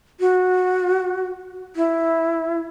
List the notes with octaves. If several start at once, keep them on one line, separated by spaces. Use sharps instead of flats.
F#4
E4